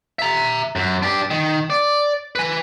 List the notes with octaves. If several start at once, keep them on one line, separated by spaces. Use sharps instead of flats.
E5 A#5
F#2
D4 G4
D#3
D5
B4 G#5